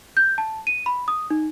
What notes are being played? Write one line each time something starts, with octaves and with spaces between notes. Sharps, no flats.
G6
A5
D#7
B5
D#6
D#4